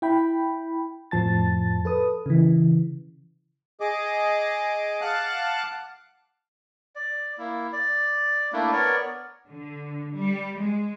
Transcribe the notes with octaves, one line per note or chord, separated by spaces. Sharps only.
E4 G5 B5
F2 A2 F3 A5 A6
A4 B4 D#6
C#3 E3
G#4 D#5 D6
F5 F#5 A5 D6 F#6
D5
A#3 E4
D5
A3 A#3 D4 E4
B3 A#4 C#5 D5
D3
G3
G#3